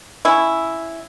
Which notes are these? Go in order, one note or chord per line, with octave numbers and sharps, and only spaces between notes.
C#4 E4